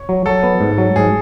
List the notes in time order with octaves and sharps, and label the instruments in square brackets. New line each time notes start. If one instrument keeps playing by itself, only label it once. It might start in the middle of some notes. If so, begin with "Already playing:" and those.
Already playing: [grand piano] C#5
[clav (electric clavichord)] F#3
[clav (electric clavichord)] F#3 [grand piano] A4
[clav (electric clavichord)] B3
G#2
F#3
[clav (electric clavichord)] G#2 [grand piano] G#4